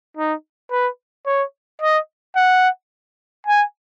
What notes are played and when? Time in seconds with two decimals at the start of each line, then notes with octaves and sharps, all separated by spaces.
0.17 D#4
0.71 B4
1.27 C#5
1.82 D#5
2.36 F#5
3.47 G#5